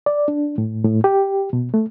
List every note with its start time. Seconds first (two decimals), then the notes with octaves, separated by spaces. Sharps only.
0.06 D5
0.28 D4
0.58 A2
0.84 A2
1.04 G4
1.53 B2
1.74 A3